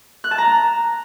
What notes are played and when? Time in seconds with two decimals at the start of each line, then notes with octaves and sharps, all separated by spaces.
0.24 F#6
0.31 A5
0.38 A#5